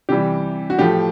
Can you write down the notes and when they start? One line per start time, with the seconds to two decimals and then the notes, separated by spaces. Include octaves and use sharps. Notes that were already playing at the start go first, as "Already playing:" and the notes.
0.09 C3 E3 G3 G4
0.70 F#4
0.79 A2 F3 A3 G4